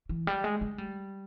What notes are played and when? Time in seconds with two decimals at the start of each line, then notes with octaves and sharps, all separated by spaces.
0.09 E3
0.27 G3
0.44 G#3
0.61 G#3
0.78 G3